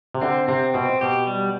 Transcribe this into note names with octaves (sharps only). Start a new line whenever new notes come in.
C3
D3 C4
C3 C4
B2 C4
B2 G4
G3